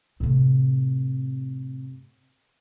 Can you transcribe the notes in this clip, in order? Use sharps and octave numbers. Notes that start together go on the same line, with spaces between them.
A2 C3